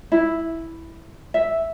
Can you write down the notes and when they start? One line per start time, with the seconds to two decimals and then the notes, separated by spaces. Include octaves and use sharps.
0.12 E4
1.34 E5